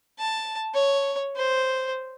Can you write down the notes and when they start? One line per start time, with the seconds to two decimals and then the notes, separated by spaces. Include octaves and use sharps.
0.19 A5
0.74 C#5
1.36 C5